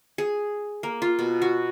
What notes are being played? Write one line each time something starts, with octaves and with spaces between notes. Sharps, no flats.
G#4
A#3
F4
B2
F#4